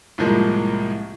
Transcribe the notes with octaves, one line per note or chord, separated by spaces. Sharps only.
C2 A2 F3 G#3 A#3